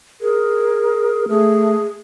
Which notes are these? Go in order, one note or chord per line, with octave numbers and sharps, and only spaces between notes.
G#4 A#4
A3 G#4